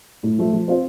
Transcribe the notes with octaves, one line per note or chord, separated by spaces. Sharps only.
A2
F3 A3
F3
C4 F4 C5